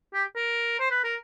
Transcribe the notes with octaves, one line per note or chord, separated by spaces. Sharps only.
G4
A#4
C5
B4
A#4